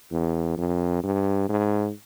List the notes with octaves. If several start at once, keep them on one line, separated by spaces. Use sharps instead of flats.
E2
F2
G2
G#2